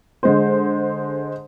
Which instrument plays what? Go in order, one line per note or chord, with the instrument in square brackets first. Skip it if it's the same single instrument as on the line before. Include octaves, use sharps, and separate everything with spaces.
[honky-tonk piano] D3 G#3 C5